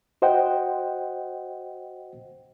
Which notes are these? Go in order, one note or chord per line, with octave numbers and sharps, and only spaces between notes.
F#4 C5 D#5 F#5 G5